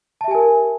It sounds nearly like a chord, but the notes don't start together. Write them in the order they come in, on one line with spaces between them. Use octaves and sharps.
A5 E5 G4 G#5 A#4